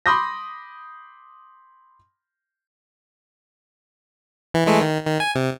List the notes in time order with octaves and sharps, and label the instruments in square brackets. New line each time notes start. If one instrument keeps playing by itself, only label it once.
[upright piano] B5 C6 D6 D#6 G6 A#6
[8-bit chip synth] E3
E3 G#3 A3
D#3
D#3
G#5
C3